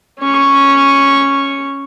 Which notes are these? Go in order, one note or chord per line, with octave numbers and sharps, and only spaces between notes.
C#4 C#6